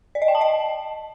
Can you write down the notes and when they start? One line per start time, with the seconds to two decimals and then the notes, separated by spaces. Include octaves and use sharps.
0.15 D5
0.22 D#5
0.28 G5
0.35 A5
0.41 D#5